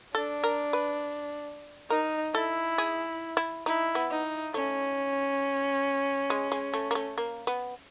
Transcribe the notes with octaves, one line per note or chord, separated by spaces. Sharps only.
D4 A4
A#4
B4
D#4 A#4
E4 A4
G#4
E4
D#4 E4
B3
D#4
A3 C#4
G#3
G#3
A3
A#3
A3
A#3
B3